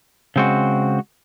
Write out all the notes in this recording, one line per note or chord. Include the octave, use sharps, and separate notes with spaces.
C#3 G#3 C4 F#4